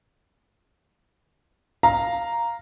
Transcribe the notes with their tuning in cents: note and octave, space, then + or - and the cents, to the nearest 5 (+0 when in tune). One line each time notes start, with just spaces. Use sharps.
F5 +0 A#5 +0